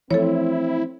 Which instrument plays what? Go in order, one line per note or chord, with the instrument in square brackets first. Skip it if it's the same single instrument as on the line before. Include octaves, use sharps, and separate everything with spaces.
[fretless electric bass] E3 F3 A3 [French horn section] C4 [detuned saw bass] E4 [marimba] A4 C#5